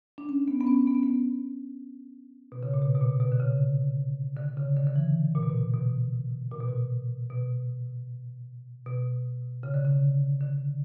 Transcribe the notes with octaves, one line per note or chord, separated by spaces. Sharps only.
D4
C#4
B3
B3
C#4
B3
C#4
B3
B2
C#3
A#2
B2
B2
A#2
B2
D3
C#3
D3
C#3
D3
D3
E3
A#2
B2
A#2
B2
A#2
B2
A#2
B2
B2
C#3
D3
C#3
D3